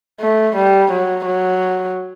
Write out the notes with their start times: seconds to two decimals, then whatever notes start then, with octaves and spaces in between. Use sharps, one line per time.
0.20 A3
0.56 G3
0.91 F#3
1.26 F#3